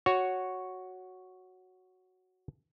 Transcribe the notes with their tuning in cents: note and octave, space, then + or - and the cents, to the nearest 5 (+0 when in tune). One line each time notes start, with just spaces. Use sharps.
F#4 +0 C#5 +0